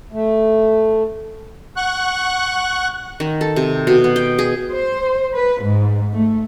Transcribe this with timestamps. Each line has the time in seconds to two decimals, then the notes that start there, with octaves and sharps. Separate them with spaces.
0.12 A3
1.77 F#5 C#6 F#6
3.20 D#3
3.41 A4
3.56 C3
3.87 B2
4.04 B3
4.16 G5
4.38 G#4
4.73 C5
5.34 B4
5.62 G#2
6.13 A3